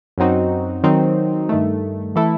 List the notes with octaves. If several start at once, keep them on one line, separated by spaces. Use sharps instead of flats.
F#2 F#3 C4 D#4 F#4
D#3 F#3 C4 D#4
G2 D#3 A3
E3 A3 E4 A4